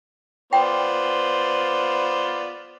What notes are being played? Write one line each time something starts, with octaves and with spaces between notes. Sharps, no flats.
B3 F4 C5 D5 G5